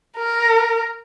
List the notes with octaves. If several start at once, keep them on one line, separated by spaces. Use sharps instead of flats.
A#4